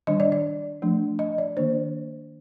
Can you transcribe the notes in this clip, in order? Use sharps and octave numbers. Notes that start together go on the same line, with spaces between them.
D#3 G3 D4 D#5
D5
D5
F3 A3 D4
D#5
D5
D#3 A#3 D4 C5